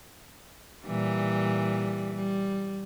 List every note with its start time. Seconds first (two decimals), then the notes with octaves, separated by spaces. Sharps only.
0.86 A#2 E3 G3
2.16 G3